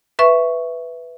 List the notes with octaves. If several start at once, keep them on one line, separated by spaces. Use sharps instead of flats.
B4 E5 C#6